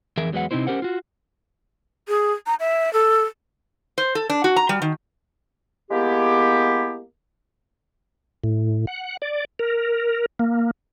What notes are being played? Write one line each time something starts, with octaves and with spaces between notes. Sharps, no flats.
F2 E3 G#4 A#4 E5
E2 F#3 G#3 B4 F#5
C3 C4 D#4 E4 C5
C#4 D4 G4 A#4 C5 F#5
F4 F#4
G#4
A#5
E5
A4
C5
A4
D4
F#4
A#5
G3
D#3
G#3 A#3 B3 E4 G4
A2
F#5
D5
A#4
A#3